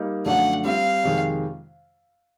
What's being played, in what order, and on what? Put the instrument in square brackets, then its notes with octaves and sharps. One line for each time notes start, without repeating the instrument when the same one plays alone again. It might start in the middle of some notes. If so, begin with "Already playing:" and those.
Already playing: [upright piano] G3 A#3 D#4
[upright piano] F#2 D3 F3 A3 D4 [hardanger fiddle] F#5
[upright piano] G3 C4 F4 [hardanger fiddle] F5
[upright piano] F2 C3 D#3 G#3